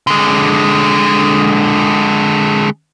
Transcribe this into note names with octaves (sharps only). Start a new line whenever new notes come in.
D3 G#3